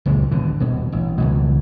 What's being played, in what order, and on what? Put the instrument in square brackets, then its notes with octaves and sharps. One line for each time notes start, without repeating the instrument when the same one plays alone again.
[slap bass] F#1 C#2 A#2 G#3
G#1 B2 D3
D#1 B2
A1
C#2 B2 D#3 F#3